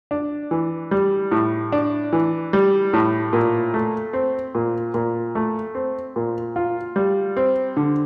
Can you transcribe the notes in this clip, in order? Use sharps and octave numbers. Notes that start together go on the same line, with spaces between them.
D4
E3
G3
A2
D4
E3
G3
A2
A#2
A3
C4
A#2
A#2
A3
C4
A#2
F4
G3
C4
D3